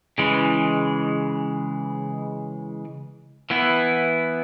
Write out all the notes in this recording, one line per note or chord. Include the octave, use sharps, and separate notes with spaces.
C#3 E3 G#3
E3 B3 E4